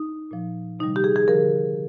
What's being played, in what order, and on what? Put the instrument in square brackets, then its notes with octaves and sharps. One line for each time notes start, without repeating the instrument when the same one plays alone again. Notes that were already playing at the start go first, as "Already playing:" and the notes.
Already playing: [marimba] D#4
A#2 F3
C3 D#3 G3 D#4
G4
G#4
G#4
D3 F3 A#4